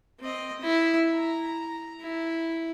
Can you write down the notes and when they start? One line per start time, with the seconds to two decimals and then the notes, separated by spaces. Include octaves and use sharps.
0.20 C4 D#5
0.61 E4
1.15 A#5
2.01 E4